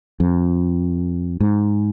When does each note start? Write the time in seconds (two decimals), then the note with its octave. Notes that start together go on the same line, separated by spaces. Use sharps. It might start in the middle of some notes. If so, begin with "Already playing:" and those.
0.20 F2
1.40 G#2